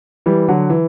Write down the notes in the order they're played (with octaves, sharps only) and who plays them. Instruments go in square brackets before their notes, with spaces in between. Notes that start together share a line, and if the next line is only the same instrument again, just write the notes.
[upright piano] E3 G3
D3 F#3
E3